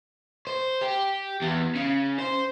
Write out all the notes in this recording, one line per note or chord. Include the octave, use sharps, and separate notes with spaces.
C5
G4
E2
C#3
C5